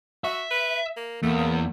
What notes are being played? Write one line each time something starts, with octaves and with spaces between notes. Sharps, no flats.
F#4 E5
B4
A#3
E2 A3 A#3
C#3